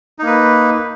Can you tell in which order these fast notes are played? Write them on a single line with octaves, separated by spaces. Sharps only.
D#4 A#3 B4